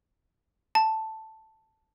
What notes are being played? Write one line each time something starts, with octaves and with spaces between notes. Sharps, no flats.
A5